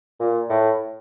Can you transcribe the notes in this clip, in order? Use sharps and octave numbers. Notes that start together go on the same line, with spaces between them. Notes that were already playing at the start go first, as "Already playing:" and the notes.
A#2
A2